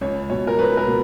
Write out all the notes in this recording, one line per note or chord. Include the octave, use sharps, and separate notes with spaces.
C#2 C#5
B2 C#5
A#4
C#2 B4
A#4
B2